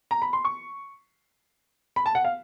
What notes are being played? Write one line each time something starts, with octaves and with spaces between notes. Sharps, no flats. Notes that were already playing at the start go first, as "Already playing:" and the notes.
A#5
B5
C6
C#6
B5
A5
F#5
F5